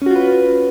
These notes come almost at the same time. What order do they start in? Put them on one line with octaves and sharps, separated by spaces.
C#4 F#4 F4 B4